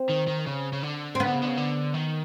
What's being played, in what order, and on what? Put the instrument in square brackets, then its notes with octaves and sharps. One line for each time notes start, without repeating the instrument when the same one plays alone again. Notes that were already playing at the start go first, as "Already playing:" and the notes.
Already playing: [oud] C4
[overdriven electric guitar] D#3
D#3
C#3
C#3
D3
[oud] C4
[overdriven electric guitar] C#3 [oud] B3
[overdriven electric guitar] D3
C#3
D3
C#3
D3
D#3